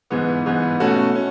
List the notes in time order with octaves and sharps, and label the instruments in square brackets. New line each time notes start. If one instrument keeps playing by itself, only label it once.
[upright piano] G#2 E3 B3
G#2 E3 B3
B2 A3 C#4 F#4
C#4